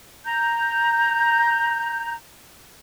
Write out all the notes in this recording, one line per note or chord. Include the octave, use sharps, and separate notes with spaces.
A#5 G6